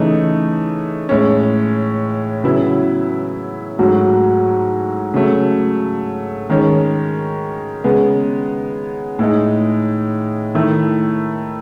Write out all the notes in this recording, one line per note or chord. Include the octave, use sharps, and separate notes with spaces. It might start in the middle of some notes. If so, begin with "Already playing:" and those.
Already playing: C#3 E3 A3 D#4
A2 G#3 C#4
C#3 F#3 B3 E4
G#2 F#3 A3 C#4 F#4
C#3 F#3 A3
D#3 G#3 C#4
C#3 G#3 B3
A2 G#3 D#4
D#3 A3 E4